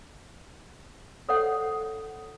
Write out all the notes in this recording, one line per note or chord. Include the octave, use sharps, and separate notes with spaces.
A4 C5 C#5 F#5